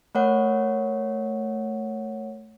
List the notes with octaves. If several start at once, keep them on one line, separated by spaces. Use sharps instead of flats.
A3 A#4 C#5 F#5